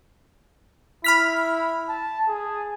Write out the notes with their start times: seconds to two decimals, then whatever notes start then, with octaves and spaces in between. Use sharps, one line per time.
1.04 E4 B5 F6 B6
1.89 A5
2.28 G#4